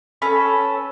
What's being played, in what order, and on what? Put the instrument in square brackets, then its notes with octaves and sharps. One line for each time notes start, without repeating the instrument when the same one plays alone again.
[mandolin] C#4 A4 B4